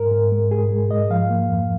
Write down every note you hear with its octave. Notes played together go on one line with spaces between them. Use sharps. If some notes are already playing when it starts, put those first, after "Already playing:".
Already playing: G#2 A#4
G#2
G#3
G#2 G#4
G#3
G#2 D#5
F3 F5
A#3
F2